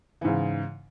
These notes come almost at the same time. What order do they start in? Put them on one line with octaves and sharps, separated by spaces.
E3 G#2 C#3